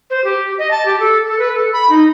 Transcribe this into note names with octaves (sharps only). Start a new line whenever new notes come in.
C5
G4
D#5
A5
G4
A4
A4
B4
A4
B5
D#4